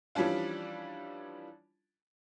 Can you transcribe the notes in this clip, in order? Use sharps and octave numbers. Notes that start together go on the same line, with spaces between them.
E3 F3 G3 C#4 D4 F4